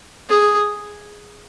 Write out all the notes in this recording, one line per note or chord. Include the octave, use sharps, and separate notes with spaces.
G#4